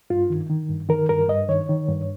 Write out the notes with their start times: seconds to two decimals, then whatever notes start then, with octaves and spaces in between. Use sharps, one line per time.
0.10 G2 F4
0.30 D#3
0.50 D#3
0.69 G2
0.89 D#3 A#4
1.09 G2 A#4
1.29 G2 D#5
1.49 D#3 C#5
1.69 D#3
1.89 G2